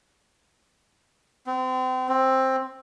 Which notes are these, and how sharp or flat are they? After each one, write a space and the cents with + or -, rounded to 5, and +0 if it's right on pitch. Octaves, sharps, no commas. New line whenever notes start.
C4 -35
C4 +10